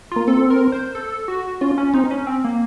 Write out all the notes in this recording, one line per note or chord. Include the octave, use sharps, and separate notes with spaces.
A#3 F4
C4 A4
A#4
C5
A4
F#4
C#4 F4
C#4
C4 D#4
C#4
C4
A#3